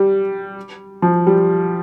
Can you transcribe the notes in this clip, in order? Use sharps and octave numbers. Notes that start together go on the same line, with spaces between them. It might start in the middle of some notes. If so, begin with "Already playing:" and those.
Already playing: G3
F3
G3